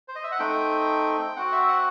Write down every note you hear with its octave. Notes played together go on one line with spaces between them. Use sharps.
C5
D#5
E5
F#5
A3 C4 D#4 G5
C4 F#4 F#5
E5
F#5